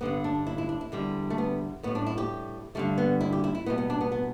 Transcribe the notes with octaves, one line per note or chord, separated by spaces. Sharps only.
G2 D3 G3 B3
D4
E4
E4
D4
E4
E2 D3 G3
A3
B3
A2 G3 B3
D4
E4
G4
G2 D3 G3 A3
B3
E4
G4
E4
E4
E2 B2 G3 B3
B3
D4
B3
B3